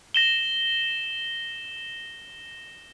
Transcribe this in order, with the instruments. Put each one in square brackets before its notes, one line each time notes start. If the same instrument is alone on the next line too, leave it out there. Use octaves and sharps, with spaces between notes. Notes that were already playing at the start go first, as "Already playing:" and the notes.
[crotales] A#6 E7 G7